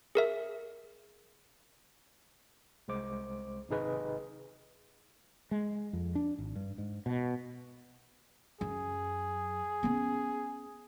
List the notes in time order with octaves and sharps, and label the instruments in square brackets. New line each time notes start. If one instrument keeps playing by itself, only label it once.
[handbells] G#4 A#4 E5
[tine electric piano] C2 G#3 C5 D6
G#1 C3 D#4 G#4 B4 D#5
[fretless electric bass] G#3
F2
D4
G#1
G2
G#2
B2
[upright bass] F#2 [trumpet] G#4
[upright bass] B3 C#4